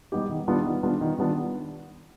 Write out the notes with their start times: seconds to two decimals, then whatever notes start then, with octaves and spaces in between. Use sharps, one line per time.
0.12 G3 B3 D#4 G4
0.29 D#3
0.48 G3 B3 D4 F4
0.65 D#3
0.83 G3 B3 D4 F4
1.01 D#3
1.19 G3 B3 D4 F4